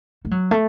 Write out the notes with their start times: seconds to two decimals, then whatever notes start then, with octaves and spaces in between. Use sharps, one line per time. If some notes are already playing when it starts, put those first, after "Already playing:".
0.25 A3
0.31 F#3
0.51 A3